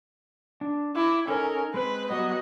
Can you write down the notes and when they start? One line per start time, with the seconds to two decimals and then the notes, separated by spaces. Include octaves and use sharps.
0.61 D4
0.96 E4 D6
1.28 C#4 D#4 A4 A#4
1.74 G#3 C4 B4
2.10 F#3 G3 B3 F#4 D#5